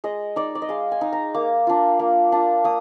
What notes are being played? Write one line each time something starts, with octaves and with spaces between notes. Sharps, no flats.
G#3 D#5
D#4 D5
D5
D#5
G#3 F5
G#5
D#4
A#5
A#3 D6
D4 F4
A#3
D4 F4
A#3 D#6